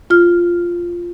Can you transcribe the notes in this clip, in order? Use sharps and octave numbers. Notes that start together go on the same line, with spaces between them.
F4 F6